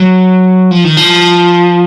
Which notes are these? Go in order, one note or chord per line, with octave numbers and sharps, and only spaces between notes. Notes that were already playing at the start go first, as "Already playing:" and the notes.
Already playing: F#3
F3
D#3
F3